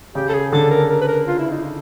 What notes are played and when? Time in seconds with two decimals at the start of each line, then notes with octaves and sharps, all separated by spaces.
0.15 C#3 G4
0.29 A4
0.33 G#4
0.52 D3 A4
0.70 A#4
0.90 A#4
1.01 B4
1.08 A#4
1.27 F4
1.39 E4
1.51 D#4